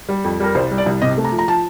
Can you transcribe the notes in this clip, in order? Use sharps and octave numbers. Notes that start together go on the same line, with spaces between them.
G3
F2
G3 A#4
C2 C5
G3
D5
C2
C3 D#5
A3
A#5
F3
A#5
F3 A5